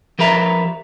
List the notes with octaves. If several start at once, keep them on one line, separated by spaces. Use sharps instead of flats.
F3 G4 A#4 B4 E5 A#5